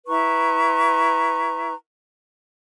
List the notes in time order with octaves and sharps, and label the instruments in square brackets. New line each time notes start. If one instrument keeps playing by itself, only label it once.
[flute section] E4 B4 A#5 C#6